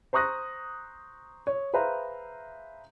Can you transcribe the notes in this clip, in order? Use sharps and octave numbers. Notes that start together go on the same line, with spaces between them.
C5 A#5 C#6 D#6 F#6 A#6
C#5
G#4 B4 C5 E5 F5 A#5